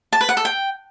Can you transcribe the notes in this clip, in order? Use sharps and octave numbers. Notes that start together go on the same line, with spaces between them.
A5
B4
F#5
A4
G5